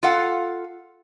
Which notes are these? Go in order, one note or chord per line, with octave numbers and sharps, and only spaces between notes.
F4 A4 F5 F#5